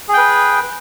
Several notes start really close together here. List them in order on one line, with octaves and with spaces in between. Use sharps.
G#4 G5 B4